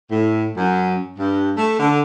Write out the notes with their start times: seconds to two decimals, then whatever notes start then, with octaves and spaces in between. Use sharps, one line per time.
0.11 A2
0.56 F#2
1.18 G2
1.57 A3
1.79 D3